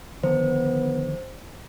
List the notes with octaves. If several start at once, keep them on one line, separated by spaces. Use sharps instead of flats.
D3 D#3 F3 B3 C5